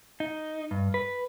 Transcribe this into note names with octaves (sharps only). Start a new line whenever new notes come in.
D#4
G2
B4